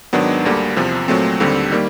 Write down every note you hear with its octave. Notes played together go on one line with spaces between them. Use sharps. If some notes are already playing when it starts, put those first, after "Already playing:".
G#2 D#3 F#3 B3 D4
D2 D3 G3 A#3
E2 C3 F3
A#2 F#3 A3 C4
D#2 D3 G3 C4
D#3 G3 A#3